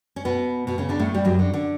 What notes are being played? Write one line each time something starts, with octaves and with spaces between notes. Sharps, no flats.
C#4
B2 B3
B2 B3
C#3 C#4
D3 D4
A2 A3
G3
F#2 F#3
D3
D3